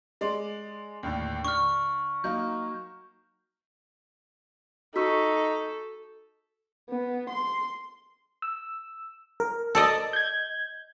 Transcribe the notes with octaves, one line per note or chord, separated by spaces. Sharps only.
G#3 D5 C6
D#2 A2 D3
D3 C#6 F6
F#3 A#3 D#4 G6
D#4 F#4 A4 C#6 E6 B6
B3
C6
E6
A#4
A4 D5 D#5
G6 G#6